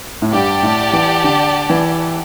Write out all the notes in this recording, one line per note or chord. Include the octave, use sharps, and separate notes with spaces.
A2
G2 G4 D5 F#5 A5
A2
E3
D3
E3